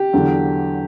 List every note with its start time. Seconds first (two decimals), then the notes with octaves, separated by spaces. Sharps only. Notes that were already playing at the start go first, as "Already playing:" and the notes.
Already playing: G4
0.13 E2 D3 F#3